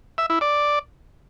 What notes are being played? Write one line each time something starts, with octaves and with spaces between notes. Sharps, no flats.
E5
E4
D5